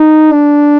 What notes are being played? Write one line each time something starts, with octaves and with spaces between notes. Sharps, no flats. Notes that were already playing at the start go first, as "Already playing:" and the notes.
Already playing: D#4
D4